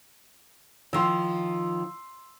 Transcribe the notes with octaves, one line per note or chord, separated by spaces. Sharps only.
D#3 F3 C6 E6